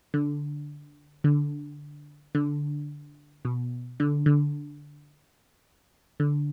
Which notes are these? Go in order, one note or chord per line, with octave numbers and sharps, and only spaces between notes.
D3
D3
D3
B2
D3
D3
D3